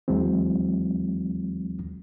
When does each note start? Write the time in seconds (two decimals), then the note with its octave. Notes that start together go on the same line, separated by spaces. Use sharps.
0.08 D#2 E3 F#3 G#3 C4